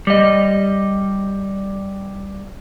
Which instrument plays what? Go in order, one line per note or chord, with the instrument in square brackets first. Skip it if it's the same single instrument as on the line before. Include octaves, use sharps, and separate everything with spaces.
[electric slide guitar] G3 D#5